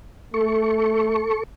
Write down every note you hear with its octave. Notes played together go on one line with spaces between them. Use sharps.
A3 A4 C#6